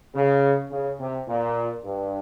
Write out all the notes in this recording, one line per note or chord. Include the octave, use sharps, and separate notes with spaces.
C#3
C#3
C3
A#2
G2